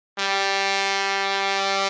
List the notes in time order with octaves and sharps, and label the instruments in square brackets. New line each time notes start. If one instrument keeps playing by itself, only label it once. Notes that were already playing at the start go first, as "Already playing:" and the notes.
[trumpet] G3